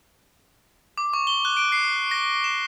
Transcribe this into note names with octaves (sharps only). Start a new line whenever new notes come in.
D6
C#6
G7
F#6
D7
C7
A#6
E7